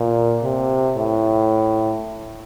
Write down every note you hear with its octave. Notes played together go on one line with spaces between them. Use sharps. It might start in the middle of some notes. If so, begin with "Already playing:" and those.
Already playing: A#2
C3
A2